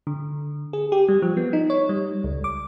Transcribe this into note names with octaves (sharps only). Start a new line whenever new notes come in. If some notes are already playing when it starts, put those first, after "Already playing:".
D3
G#4
G4
G3
F3
B3
D#4
C#5
G3
C#2
D6